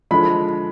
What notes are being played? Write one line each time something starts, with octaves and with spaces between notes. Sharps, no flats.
D3 F3 G#3 B5